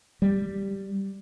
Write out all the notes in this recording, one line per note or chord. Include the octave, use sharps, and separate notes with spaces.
G3